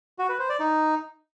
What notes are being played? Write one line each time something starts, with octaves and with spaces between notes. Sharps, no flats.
F#4
B4
C5
D5
D#4